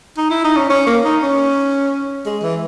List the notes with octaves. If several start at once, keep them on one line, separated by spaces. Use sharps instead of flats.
D#4
E4
D#4
C#4
C#4
A#3
D#4
C#4
G#3
E3